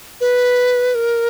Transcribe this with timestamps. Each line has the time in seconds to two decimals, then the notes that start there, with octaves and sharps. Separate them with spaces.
0.21 B4
0.95 A#4